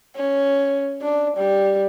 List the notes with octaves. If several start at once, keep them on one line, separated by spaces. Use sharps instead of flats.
C#4
D4
G3